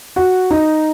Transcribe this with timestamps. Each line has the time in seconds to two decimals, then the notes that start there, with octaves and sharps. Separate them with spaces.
0.16 F#4
0.51 D#4